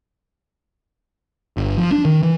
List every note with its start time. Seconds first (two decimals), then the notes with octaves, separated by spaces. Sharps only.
1.57 G1
1.77 F3
1.92 D4
2.05 D#3
2.23 E3